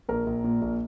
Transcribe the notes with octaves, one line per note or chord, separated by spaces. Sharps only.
A#1 A#4
A#1
A#2
A#1